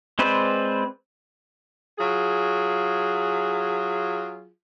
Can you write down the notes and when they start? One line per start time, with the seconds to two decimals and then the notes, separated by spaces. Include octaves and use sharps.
0.19 G#3 C4 B4 C5 D5
1.98 F#3 F4 G#4